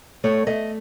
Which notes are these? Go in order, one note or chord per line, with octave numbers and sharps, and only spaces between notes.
A3 C#5
A3 D#5